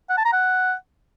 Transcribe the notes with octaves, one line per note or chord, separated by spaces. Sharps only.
F#5
A5
A#5
F#5